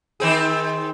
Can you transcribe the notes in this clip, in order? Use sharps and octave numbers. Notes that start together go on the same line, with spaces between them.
D#3 C4 G#4